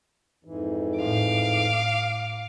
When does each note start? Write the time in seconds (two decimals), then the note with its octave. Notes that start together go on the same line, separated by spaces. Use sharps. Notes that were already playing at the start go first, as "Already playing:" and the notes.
0.45 F2 G#2 E3
0.99 A2 F5 D6